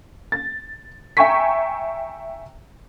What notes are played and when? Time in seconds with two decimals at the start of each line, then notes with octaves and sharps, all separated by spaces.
0.32 A6
1.17 E5 G5 G#5 A#5 C#6 B6